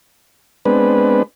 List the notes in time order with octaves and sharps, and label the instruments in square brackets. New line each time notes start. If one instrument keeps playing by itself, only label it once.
[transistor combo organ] G#3 B3 C4 D4 B4